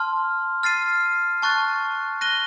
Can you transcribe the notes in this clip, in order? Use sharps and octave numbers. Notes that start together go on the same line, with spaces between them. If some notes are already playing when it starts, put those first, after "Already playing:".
Already playing: A5 C6 F6
F6 A6 C7 D#7
A5 C#6 F#6 A6
F#6 A#6 D#7 G7